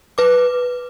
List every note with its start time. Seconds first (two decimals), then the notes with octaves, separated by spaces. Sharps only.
0.18 B4 D6